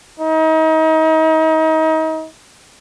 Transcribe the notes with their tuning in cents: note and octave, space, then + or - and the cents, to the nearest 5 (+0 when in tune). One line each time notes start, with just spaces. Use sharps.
D#4 +35